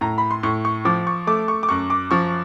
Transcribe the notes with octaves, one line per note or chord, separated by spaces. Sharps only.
A2 A#5
B5
C6
A2 C#6
C#6
F3 D6
C#6
A3 D6
C#6
D6
F#2 C#6
D6
F3 C#6